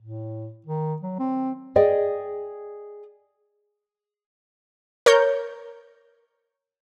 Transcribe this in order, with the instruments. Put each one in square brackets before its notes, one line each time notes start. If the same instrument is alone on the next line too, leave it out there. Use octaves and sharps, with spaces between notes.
[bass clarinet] A2
D#3
F#3
C4
[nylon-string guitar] G#4 D5 D#5 G5
[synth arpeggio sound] A#4 C#5 G6